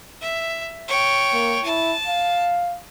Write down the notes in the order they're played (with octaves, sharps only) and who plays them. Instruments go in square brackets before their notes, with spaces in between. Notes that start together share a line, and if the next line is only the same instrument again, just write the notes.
[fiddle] E5
C#5 G5
[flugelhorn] A#3
[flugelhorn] E4 [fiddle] A5
[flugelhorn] F5